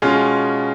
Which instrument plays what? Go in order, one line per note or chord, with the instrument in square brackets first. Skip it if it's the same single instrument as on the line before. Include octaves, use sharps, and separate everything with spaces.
[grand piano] B2 G#3 C#4 F4